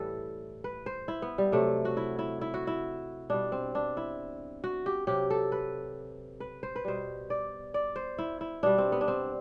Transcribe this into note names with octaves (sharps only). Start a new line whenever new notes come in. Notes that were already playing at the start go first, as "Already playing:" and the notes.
Already playing: A2 E3 G3 A4 B4
B4
C5
E4
B3
G3
C3 F#3 A3
F#4
E4
E4
E4
F#4
E4
B2 G3 D4
C4
D4
E4
F#4
G4
C3 F#3 G4
A4
B4
B4
C5
B4
B2 G3 C5
D5
D5
C5
E4
E4
B2 G3 D4
C4
B3
D4
C4